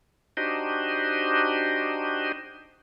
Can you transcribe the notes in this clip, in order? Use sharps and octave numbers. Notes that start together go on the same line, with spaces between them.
D4 D#4 F#4 G4 C5 D#5